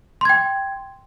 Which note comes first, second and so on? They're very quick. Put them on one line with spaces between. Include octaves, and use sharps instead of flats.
C6 G#6 G5